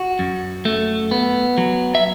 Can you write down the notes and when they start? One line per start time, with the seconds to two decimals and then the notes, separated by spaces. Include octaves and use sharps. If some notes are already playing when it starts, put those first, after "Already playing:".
Already playing: F#4
0.19 F#2
0.65 A3
1.11 B3
1.58 F#3
1.95 E5